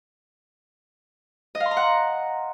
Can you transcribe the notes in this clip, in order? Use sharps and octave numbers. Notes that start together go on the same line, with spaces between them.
D#5
F5
C6
A#5
F#5